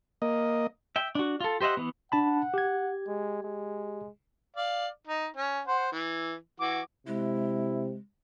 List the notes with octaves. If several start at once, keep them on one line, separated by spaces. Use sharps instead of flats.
A#3 D#5
E5 G5
D4 F#4
F4 A4
G4 C5 D#5 E5 F#5
E3 B3
D4 F#5 A5 B5
G4 G#6
G#3
G#3
D5 F5
D#4
C#4
C5 F#5
E3
E3 F#4 D6
C3 G#3 E4